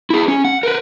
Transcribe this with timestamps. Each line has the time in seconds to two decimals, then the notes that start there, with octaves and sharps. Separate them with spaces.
0.10 E4 G#4
0.28 C#4
0.45 F#5
0.63 A#4 B4